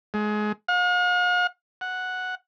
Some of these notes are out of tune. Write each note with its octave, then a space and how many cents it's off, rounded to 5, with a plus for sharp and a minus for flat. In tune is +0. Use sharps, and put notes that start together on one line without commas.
G#3 +25
F5 +45
F#5 -5